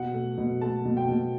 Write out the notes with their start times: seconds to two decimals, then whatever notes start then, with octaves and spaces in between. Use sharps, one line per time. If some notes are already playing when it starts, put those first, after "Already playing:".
Already playing: B2 F#5
0.14 A3
0.38 B2
0.61 A3 A5
0.85 B2
0.97 G5
1.09 B2